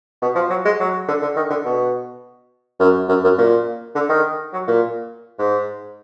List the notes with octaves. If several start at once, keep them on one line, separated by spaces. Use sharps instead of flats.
B2
F3
F#3
G#3
F#3
D3
D3
D#3
D3
B2
F#2
F#2
F#2
A#2
D3
D#3
F#3
A#2
G#2